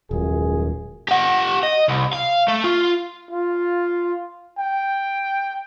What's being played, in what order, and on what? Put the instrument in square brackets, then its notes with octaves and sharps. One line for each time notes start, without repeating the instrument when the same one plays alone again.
[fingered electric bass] D#1 [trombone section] C#2 F#2 G#4
[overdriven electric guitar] G4 F#5
D#5
C2
F5
A3
F4
[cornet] F4
G5